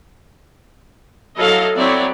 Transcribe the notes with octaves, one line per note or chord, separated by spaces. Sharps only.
F#3 E4 A4 D#5 F5
F#3 C4 E4 C#5 D5